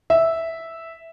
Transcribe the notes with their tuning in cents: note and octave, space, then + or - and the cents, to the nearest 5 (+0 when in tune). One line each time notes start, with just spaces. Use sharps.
E5 -5